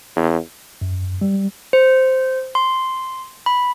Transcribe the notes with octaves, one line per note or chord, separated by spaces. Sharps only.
E2
F#2
G3
C5
C6
B5